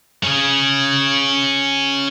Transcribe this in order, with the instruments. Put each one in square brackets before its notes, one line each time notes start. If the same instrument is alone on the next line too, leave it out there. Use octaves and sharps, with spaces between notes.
[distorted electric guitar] C#4 G#4